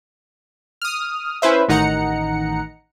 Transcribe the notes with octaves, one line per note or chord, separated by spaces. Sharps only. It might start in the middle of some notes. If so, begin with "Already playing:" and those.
D#6 F6
C#4 E4 B4 C5 E5
A1 D#3 D#4 F#5 A#5 C#7